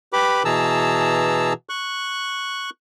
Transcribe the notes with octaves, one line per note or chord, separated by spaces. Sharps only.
G4 B4 B5 D6
B2 E3 G#4 A5 A#5 E6
C#6 F#6